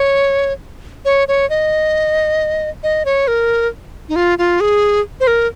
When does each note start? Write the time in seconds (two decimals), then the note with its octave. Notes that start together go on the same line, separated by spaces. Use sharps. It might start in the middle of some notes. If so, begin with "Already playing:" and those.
Already playing: C#5
1.05 C#5
1.28 C#5
1.50 D#5
2.83 D#5
3.05 C#5
3.28 A#4
4.09 D#4
4.16 F4
4.38 F4
4.60 G#4
5.20 C5
5.27 A#4